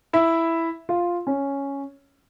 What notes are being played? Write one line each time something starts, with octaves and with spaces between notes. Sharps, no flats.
E4 E5
F4 F5
C#4 C#5